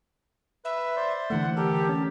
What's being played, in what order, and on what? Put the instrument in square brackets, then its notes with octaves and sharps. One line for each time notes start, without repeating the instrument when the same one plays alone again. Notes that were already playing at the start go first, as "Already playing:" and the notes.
[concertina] B4 [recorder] E5
[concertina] C5 D5 C6
[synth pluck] D3 E3 A3 [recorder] F#5
[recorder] G4 [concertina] A4 A#4
[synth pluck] C#4 [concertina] A5